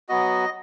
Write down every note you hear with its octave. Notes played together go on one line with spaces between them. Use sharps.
F#3 B3 F#4 D#5